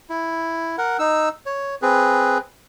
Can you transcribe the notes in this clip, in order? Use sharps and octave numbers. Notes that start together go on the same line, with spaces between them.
E4
A#4 F#5
D#4 E6
C#5
C4 G#4 B4